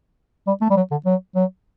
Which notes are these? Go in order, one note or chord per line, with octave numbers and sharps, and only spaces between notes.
G3
A3
G3
F#3
D3
F#3
F#3